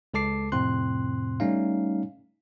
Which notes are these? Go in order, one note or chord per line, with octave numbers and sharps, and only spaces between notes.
C#2 G#3 A4 A5 D6 C7
F2 A2 C3 C4 C6 F#6
G3 A3 C#4 D#4 F5